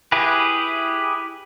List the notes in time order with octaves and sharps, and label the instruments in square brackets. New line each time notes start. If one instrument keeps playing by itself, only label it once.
[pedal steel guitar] E4 G4 G#4 B4